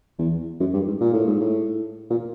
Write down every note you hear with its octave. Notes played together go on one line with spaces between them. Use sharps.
E2
F#2
G2
G#2
A#2
A2
G#2
A2
A#2